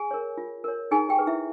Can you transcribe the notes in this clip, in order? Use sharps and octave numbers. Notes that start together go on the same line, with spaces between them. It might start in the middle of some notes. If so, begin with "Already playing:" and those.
Already playing: G#4 G#5
A#4 C#5
F4
A#4 C#5
D#4 G#4 G#5
G4 G5
G#4 B4
E4 E5